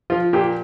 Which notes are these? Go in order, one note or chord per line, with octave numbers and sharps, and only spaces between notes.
F3 F4
A#2 G4